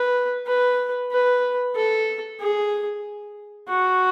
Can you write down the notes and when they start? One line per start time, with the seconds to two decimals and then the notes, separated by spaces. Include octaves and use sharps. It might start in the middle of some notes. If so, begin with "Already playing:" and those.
Already playing: B4
0.47 B4
1.12 B4
1.76 A4
2.40 G#4
3.68 F#4